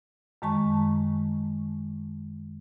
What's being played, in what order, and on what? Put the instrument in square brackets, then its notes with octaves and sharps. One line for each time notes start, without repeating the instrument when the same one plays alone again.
[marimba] F#2 D#3 G#3 A5 C#6